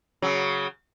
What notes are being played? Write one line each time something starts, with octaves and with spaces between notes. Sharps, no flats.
C#3 F#3